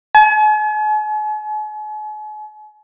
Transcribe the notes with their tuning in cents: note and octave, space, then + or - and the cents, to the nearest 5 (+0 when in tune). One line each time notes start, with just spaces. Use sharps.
G#5 +45